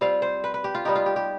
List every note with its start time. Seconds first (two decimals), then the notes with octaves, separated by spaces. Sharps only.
0.01 G3 C4 F4 F5
0.22 C5
0.44 B4
0.54 B4
0.64 G4
0.75 F4
0.85 G3 B3 D#4 G4
0.95 F4
1.06 G4
1.16 G4